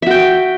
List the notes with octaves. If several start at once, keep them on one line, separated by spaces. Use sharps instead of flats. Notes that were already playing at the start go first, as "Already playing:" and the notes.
F#4 E5 G5